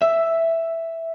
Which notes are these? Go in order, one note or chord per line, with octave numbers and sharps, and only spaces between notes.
E5